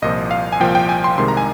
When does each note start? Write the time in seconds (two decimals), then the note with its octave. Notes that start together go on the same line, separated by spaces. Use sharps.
0.02 C2 A#2 F3 D#5
0.31 F5
0.52 G#5
0.60 C2 A#2 F3 G5
0.75 G5
0.89 G#5
1.04 C6
1.18 C2 C3 D#3 G#3 C6
1.28 A#5
1.37 G#5